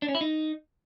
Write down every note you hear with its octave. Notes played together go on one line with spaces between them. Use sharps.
D4
C#4
E4
D#4